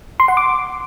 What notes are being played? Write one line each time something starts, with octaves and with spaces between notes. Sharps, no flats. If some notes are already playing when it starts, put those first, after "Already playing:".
C6
F#5
D6